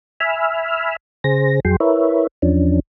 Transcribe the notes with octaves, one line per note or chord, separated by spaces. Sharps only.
E5 G#5 B5 E6 F6
C#3 G#4 C5 A#6
F2 F#3 G#4 G5 C6
E4 A#4 B4 C#5 E5
E2 F3 C#4 D4